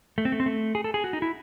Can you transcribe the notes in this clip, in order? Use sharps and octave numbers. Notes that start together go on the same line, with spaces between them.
A3
C4
A3
C4
A3
G#4
A4
G#4
F#4
D#4
E4